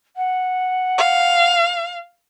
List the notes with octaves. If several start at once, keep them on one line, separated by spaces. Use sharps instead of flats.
F#5
F5